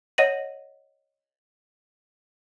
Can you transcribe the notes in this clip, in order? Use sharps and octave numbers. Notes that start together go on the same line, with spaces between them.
C#5 D#5 F#5 A#6 D#7 F#7